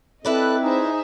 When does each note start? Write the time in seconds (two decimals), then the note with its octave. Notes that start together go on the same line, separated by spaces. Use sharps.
0.25 C4 E4 A4 B4 D5 D#5 F#6
0.62 D#4 G#4 C5 E5